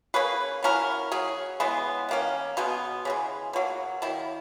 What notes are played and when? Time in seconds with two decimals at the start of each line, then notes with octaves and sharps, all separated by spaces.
0.14 A#3 C#4 G#4 B4
0.63 F#3 C#4 E4 A#4
1.12 F#3 C#4 G#4
1.60 C#3 E3 G#3 B3
2.09 D#3 A#3 C#4
2.57 B2 G#3 B3
3.05 C#3 E3 G#3
3.53 B2 F#3 A#3
4.02 D#3 A#3 E4